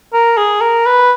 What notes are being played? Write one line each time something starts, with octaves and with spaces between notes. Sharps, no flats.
A#4
G#4
A#4
B4